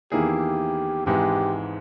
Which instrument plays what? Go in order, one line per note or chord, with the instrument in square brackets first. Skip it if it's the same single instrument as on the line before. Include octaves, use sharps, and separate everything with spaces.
[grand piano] E2 D#3 A#3 E4 G#4 [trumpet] G4
[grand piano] G#1 G#2 E3 G#3 [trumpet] G4